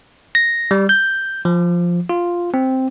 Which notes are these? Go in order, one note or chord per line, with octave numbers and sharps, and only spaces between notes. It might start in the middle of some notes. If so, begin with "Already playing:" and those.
A#6
G3
G6
F3
F4
C4